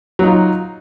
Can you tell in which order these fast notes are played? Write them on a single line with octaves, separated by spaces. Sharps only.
F#3 D#4 F4